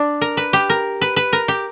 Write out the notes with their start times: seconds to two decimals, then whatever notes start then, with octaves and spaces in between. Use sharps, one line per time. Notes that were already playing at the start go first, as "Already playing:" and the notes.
Already playing: D4
0.21 A#4
0.37 B4
0.53 G4
0.70 A#4
1.01 B4
1.16 B4
1.33 A#4
1.48 G4